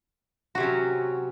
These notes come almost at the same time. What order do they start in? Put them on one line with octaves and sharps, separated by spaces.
F#4 C3 C#4 F#3